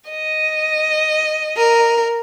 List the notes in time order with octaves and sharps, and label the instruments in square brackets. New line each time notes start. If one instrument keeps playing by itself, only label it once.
[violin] D#5
[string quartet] A#4